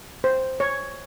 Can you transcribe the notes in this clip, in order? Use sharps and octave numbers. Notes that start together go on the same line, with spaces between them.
C5
C#5